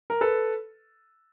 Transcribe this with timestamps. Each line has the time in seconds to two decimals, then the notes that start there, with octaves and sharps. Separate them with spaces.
0.10 A#4
0.21 A4 B4